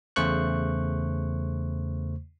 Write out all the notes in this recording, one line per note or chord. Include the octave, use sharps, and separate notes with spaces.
E2 C#3 A3 C5 C#6 F#6